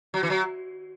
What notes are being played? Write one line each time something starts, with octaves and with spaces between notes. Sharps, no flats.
F#3
E3
F#3